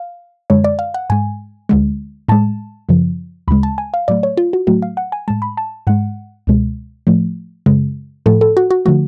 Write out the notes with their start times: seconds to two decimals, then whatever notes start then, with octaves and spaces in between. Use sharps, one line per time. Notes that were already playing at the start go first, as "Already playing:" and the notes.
Already playing: F5
0.50 F#2 D3 G#3 C#5
0.64 D5
0.79 F5
0.94 F#5
1.10 G#2 G#3 G#5
1.69 D2 D3 G#3
2.28 A2 G#3 A5
2.89 F#2 C#3 F3
3.48 D2 C#3 G#3 B5
3.63 A5
3.78 G#5
3.94 F5
4.08 A2 F#3 A3 D5
4.23 C#5
4.37 F4
4.53 F#4
4.67 A2 F#3 A3 F#4
4.82 F5
4.97 F#5
5.12 G#5
5.28 A2 G#3 A5
5.42 B5
5.57 A5
5.87 G#2 G#3 F#5
6.47 C#2 B2 G#3
7.07 A2 F3 A3
7.66 F#2 C#3 G#3
8.26 A2 F3 A3 A4
8.41 A4
8.57 F#4
8.71 F#4
8.85 D3 F3 A3 F#4